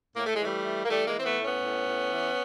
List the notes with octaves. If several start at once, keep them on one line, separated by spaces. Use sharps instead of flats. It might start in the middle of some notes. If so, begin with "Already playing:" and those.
A2 A#3
A3
G#3
E3 G3 A3
E3
A#3
E3 G3 A3
G#3 A#3
E3
C4
A3 B3
A2
B3 C#4
A2
A2
E3